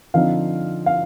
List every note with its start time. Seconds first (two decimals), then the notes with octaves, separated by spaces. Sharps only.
0.14 D3 F3 C4 D#4 F5
0.86 F5